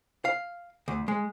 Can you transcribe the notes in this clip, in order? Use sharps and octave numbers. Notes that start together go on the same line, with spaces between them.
F5
D2
G#3